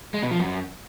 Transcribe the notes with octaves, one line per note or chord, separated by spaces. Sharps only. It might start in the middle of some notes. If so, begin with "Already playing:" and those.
G#3
B2
F3
F#2